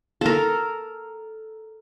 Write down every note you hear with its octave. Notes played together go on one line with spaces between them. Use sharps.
A4 A#4